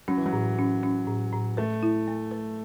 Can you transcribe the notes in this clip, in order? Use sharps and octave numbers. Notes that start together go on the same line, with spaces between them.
F#3 C#4
E3
F#3
A2
C#4
C#4
A2
A2
A3 B4
E4
A3
B4